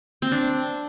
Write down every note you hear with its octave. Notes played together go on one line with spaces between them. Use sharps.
C4
D4